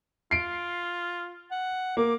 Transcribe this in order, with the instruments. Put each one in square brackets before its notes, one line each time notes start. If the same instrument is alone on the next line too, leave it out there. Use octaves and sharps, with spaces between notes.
[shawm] F4 [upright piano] C7 D7
[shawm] F#5
[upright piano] A#3 [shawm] D6